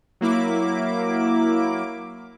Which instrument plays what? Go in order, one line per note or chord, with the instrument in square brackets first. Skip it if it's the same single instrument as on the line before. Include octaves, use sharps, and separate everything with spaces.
[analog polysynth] F#3 A#3 E4 D6